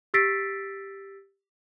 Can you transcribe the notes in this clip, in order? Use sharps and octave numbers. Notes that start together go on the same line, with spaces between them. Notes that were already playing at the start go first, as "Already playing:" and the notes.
G4 E6 A6 B6 C7 D7